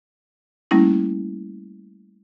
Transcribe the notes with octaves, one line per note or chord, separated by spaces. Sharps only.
G3 A3 A#3 C#4 E4